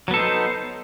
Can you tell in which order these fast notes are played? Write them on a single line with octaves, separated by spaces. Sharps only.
F#3 B3 A4 D#4 C5